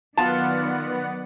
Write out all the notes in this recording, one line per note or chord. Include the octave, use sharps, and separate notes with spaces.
D#3 F#3 B3 F4 D5 F#5 A5